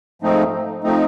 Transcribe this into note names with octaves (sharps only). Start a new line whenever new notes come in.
G#2 F3 A3 C4 D#4
F3 A3 C4 D#4